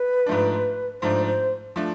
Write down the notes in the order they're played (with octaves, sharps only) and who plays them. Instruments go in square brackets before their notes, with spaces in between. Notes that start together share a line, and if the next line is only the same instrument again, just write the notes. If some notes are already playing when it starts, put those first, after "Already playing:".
Already playing: [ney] B4
[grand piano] G#2 F3 A3 D4
[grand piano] G#2 F3 A3 D4 [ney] C5
[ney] C5
[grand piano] F3 A3 D4